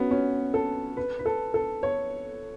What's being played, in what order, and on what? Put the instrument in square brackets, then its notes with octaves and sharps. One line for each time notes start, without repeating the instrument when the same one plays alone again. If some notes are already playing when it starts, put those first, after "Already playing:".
Already playing: [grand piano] B3 C#4 F#4
C#4
A4
B4
B4
A4
A4
C#5